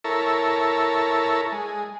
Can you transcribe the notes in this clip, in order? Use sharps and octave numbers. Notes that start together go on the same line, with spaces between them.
E4 A4 A#4 C#5
G#3